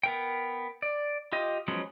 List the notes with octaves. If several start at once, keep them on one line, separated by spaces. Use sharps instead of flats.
B3 A#4 G5
D5
F4 G4 D#5
F3 F#3 G#3 B3 C#4